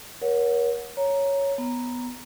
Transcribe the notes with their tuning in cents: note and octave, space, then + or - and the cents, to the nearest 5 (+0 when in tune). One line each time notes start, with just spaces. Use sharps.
A#4 +35 C#5 +0 F#5 -15
C#5 +0 A#5 +0
B3 +0 A#5 +0